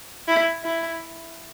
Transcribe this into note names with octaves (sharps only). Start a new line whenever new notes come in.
E4
E4